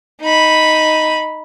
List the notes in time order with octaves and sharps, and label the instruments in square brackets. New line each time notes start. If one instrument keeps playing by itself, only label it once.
[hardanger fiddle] D#4 B5